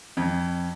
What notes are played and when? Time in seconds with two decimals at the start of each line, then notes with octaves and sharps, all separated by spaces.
0.17 F2